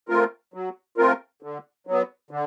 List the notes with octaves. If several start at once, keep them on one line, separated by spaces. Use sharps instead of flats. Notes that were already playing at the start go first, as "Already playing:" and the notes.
A3 C4 F4 A#4
F#3
A3 C4 F4 A#4
D3
F#3 B3
D3